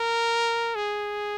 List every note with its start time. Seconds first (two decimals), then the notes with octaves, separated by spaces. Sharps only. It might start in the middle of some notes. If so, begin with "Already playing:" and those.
Already playing: A#4
0.75 G#4